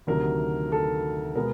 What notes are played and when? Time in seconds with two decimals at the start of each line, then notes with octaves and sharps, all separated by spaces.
0.07 D2 C3 D#3 F#3 A#4
0.72 A4
1.36 B2 G#3 B3 A#4